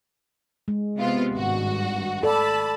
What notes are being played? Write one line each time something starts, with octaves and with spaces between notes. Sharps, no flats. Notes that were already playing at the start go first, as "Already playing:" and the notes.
G#3
C3 B3 F4
G#1 G2 F#4
A4 D5 A5 B5